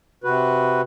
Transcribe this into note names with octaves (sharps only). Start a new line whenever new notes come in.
C3 F#4 B4